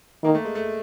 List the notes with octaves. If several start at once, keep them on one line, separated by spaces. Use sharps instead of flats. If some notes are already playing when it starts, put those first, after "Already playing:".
D#3 A#3
A3
G#3
A3